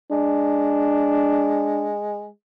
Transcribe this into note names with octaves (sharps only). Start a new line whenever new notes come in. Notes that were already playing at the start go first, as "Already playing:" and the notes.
G#3 D4